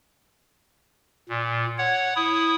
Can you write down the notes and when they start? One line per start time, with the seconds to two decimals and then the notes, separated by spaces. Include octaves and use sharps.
1.29 A#2
1.78 C#5 F#5
2.16 E4 D#6